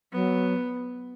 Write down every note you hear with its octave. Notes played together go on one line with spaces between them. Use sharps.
F#3 B3